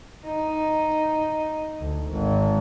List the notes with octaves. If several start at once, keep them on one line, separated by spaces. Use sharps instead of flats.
D#4
D2
G#1